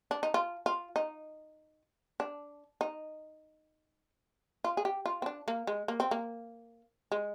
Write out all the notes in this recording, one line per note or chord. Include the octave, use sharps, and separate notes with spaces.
D4
D#4
F4
F4
D#4
D4
D#4
F4
G#4
G4
F4
C4
D4
A#3
G#3
A#3
C4
A#3
G#3